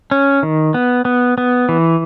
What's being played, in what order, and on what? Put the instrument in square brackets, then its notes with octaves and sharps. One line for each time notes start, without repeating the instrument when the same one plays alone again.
[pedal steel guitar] C#4
D#3
B3
B3
B3
E3